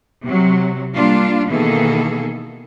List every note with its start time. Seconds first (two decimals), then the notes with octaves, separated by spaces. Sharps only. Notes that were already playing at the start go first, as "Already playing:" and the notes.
0.24 C3 F#3
0.94 G3 A#3 D4 F4
1.48 B2 D#3 E3 A#3 G#4 A4